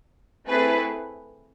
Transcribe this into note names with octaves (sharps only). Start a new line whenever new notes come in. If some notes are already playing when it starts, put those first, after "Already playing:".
A3 C4 E4 G#4 B4